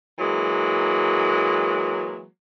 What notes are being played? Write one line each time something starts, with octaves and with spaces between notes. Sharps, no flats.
E3 F#3 G#3 A#3